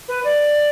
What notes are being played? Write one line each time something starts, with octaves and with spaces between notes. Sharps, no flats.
B4
D5